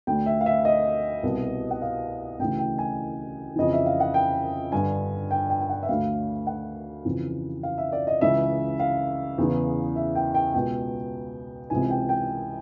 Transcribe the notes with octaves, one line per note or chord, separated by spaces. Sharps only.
D2 D3 G5
E5
F5
E5
D#5
C2 B2
F#5
F5
D2 C#3 E3 G5
G5
G#5
F2 C#3 E3 D#5
E5
F5
F#5
G5
G2 D3 G#5
G5
G5
G5
F#5
E5
D2 D3 F5
F#5
F2 C#3 E3
F5
E5
D5
D#5
C#2 C#3 E3 E5
F5
E2 C#3 E3
E5
G5
G5
C#2 B2 G5
C#2 C3 E3 G#5
G5
G5